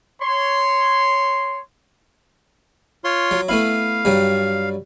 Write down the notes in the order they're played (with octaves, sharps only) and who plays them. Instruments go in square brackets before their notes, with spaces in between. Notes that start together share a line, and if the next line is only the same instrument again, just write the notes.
[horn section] C#5 C6
[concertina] F4 C#5 C6
[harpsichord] F#3
[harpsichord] A3 B3 E4 [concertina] F5
[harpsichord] G2 F#3 G3